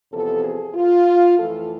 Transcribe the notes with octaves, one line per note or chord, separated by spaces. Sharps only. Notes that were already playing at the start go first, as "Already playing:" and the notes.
E2 C3 F3 B3 A4
G#4
F4
F2 E3 A3 A4